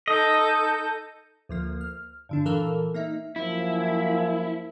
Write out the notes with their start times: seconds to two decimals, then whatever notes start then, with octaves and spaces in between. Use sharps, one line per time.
0.08 D#4 A4 D#5 G6
1.49 D2 F3 A#3
1.81 F6
2.29 G2 D3 D4
2.45 A#2 E3 A4 A#4 F5 E6
2.94 A#3 D#4 E5
3.36 F#2 F3 A#3 E4